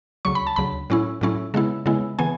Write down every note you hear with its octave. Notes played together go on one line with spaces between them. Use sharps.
D2 C#3 F#3 C#6
B5
A5
D2 C#3 F#3 B5
A2 F#3 C#4 E4
A2 F#3 C#4 E4
C#3 G#3 B3 E4
C#3 G#3 B3 E4
C#3 E3 B3 G#5